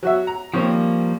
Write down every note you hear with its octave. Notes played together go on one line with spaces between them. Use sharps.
F#3 F#4 E5
A#5
D#3 F3 G3 A#3 C4 C#5